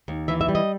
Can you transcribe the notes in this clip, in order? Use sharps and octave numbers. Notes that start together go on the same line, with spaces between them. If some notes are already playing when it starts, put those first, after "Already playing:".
D#2
E3 E5
E5
G3
D#5